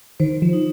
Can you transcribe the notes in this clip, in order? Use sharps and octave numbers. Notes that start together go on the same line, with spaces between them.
D#3 C5
F3
D#4